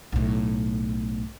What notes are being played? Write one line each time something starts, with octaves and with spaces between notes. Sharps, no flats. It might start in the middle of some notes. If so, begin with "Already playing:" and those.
B1 A2